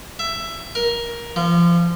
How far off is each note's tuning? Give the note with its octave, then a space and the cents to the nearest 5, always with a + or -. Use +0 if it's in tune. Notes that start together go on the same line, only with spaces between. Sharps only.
E5 +15
A#4 +15
F3 -30